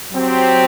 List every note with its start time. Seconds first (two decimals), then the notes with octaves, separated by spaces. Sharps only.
0.12 F#3 C4 G4